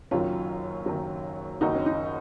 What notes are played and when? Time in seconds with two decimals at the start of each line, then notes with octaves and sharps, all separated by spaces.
0.11 F#1 F#2 D#3 F#3 C#4 F4
0.86 F#1 F#2 D#3 F#3
1.61 F#1 F#2 D#3 D#4 F#4
1.75 C#4
1.86 D#4